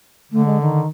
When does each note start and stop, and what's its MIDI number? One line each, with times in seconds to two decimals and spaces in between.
0.32 0.82 50
0.32 0.44 57
0.45 0.58 56
0.60 0.86 51